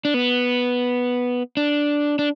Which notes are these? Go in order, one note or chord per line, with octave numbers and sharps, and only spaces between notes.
D4
B3
D4
D4